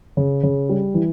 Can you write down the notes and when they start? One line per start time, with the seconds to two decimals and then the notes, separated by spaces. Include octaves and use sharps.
0.17 C#3
0.43 C#3
0.69 G3
0.94 E3